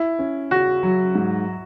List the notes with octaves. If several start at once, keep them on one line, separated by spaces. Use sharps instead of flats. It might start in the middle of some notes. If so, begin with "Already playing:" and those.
Already playing: E4
C#4
C#3 F#4
F#3
G#2